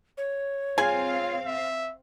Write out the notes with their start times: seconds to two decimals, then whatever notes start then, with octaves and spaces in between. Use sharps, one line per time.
0.18 C#5
0.78 C4 F4 G#4 F5 G#5
1.45 E5